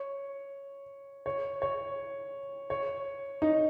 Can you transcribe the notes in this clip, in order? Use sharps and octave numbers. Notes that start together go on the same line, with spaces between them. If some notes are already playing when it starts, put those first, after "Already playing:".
Already playing: C#5
C#5
C#5
C#5
D#4